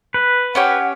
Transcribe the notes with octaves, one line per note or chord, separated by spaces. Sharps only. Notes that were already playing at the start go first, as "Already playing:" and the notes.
B4
C#4 G4 C#5 F#5